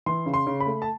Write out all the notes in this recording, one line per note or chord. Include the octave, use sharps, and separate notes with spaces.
E3 C6
C#3
C6
C#3
B5
A3
A5